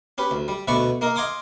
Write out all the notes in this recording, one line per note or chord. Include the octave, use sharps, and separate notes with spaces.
C#4 G4 B4
D2
G3
D2 B2 A3 B4 D5 C#6
A#3 D#4 A#4
D#5 F5 G#5 C6 D6 D#6